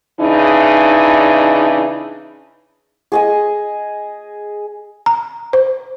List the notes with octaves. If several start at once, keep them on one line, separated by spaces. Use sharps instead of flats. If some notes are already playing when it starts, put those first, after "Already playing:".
C#3 E3 D4 D#4
G#4 D#5 G#5
A#5
C5